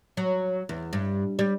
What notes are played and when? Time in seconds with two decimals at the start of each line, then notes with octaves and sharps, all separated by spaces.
0.17 F#3
0.69 E2
0.93 G2
1.39 G3